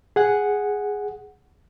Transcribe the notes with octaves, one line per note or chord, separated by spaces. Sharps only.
G#4 F#5